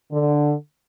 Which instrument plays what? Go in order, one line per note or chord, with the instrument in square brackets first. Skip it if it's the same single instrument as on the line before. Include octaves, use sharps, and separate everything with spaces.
[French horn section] D3